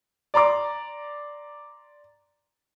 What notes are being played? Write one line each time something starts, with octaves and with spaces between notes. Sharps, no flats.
D5 A#5 C6 D6